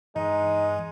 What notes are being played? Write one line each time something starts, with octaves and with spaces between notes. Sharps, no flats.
G2 E3 G#3 D#4